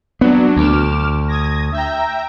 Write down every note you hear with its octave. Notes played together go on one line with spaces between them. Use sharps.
F#3 B3 D4
D2 D6 F6 E7
D#6 G#6 A#6
E5 G5 A#5